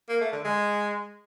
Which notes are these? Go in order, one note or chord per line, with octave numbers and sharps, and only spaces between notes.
A#3
A3
D3
G#3